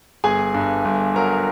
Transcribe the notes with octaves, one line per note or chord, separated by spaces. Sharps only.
G1 G#4 G#5
G2
G1
F#3 A#4 A#5